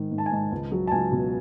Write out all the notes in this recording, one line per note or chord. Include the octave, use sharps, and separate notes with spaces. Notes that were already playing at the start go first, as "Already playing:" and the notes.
Already playing: G#2 D#3
G#2
A5
G#5
G#2 A5
C#2
F#3
A5
C#2 G#5
B2